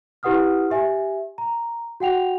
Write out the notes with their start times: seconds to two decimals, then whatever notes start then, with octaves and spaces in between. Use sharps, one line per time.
0.23 E4 G4 B4 F#5 D#6 F6
0.70 G4 E5 G#5
1.38 A#5
2.00 F#4 F#5 G5 F7